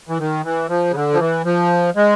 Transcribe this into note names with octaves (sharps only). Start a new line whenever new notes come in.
E3
D#3
E3
F3
C#3
D3
F3
E3
F3
G#3